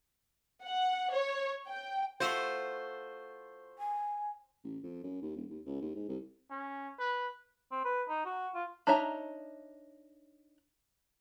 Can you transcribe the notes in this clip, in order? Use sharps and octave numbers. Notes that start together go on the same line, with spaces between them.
F#5
C#5
G5
A3 F4 F#4 C5
G#5
A1
F2
F#2
D#2
E1
D#2
C#2
D#2
G#2
C2
C#4
B4
C4
B4
D#4
F#4
F4
D4 D#4 C#5 E5 A#5